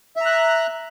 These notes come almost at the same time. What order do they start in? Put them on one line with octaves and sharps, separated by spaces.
E5 A#5 F#6